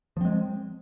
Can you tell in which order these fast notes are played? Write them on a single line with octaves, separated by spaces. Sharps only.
F3 C4 G#3